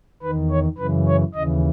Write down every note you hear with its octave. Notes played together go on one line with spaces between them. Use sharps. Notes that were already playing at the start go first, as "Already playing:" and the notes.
E2 D#3 B4
C#5
F#2 C#3 E3 B4
C#5
D#2 C#3 E3 D#5